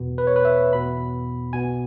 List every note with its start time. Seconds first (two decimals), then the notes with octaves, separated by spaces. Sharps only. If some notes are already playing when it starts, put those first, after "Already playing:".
Already playing: E2 B2 B3
0.18 B4
0.27 C#5
0.36 B4
0.45 E5
0.72 E2 B2 B3 B5
1.53 B1 B2 B3 G#5